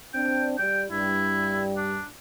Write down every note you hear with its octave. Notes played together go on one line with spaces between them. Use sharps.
C4 D4 G5
G3 G5
G2 G3 E4
D4